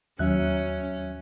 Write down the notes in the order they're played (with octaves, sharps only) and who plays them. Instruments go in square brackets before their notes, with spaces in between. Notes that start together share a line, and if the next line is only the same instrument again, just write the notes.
[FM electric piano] D#2 [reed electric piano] F#3 E5 F#6 [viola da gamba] C#4